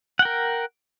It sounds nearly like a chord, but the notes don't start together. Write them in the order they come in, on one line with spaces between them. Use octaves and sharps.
F#5 G5 A#4